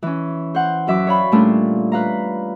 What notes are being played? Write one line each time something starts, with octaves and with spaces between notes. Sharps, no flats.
E3 C#4
C5 F#5
F#2 F#3 E5 D6
C#5 D5 F5 B5
A#2 G3 A3 C#4 D4 F4
B4 F5 A#5